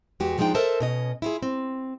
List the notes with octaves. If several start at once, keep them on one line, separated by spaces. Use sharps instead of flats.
E2 G#3 F#4 G4
F2 F3 G#3 D4 D#4 G5
A4 A#4 C5 D#5 E5 A5
B2 C#4 D#5
E4 F4 G#4
C4